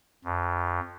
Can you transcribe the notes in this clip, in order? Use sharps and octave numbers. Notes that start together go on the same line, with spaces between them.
F2